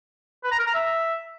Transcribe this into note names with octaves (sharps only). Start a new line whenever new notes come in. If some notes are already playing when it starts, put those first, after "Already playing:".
B4
A#5
A#4
A#5
E5